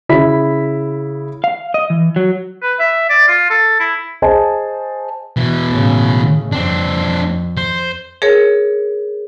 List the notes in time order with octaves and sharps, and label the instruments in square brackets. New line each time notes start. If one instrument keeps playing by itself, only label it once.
[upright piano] C#3 E4 B6
[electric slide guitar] F5
D#5
E3
F#3
[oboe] B4
E5
D5
F4
A4
E4
[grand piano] G#4 C5 D#5 G#5 A5
[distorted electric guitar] B2 E3
[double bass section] A2 C#3
[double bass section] F2 [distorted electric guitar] C4 D4
[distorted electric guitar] C5
[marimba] G#4 A#4 C#5